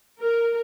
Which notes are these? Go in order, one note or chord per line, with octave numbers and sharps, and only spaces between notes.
A#4